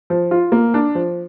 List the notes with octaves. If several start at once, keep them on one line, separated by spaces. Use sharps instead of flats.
F3
F4
A#3
D4
F3